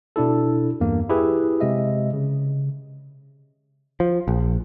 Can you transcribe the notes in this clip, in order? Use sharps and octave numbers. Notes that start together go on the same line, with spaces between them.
B2 D4 E4 A4
E2 G2 A#3
E4 G4 G#4 B4
C3 G#3 D#5 E5
C#3
F3
A#1